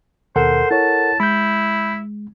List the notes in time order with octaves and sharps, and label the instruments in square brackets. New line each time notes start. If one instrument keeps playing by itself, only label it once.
[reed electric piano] D#2 B2 [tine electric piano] A4 A#4 F#5 [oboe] C5
[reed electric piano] E4 C#5 [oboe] A5
[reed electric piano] G#3 [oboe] E4 [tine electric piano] B5 G6